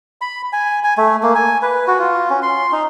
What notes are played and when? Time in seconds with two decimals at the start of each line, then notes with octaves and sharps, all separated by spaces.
0.21 B5
0.53 G#5
0.84 G#5
0.98 A3
1.23 A#3
1.35 G#5
1.62 B4
1.88 F#4
1.99 F4
2.30 C#4
2.43 C6
2.72 D#4